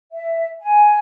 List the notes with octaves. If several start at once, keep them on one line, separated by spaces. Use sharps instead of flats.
E5
G#5